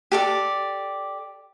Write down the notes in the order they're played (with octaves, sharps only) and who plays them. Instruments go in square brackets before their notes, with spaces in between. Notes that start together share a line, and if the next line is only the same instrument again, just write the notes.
[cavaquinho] G4 A4 D5